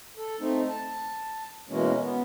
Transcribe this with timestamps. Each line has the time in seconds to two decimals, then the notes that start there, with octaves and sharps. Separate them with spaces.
0.17 A4
0.40 A3 C4 D#4
0.69 A5
1.69 B2 E3 G#3 A#3 C#4
2.02 B3